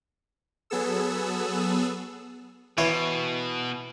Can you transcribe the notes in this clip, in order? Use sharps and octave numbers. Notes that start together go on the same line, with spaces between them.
F#3 B3 G#4 A4 E6
B2 E3 C#5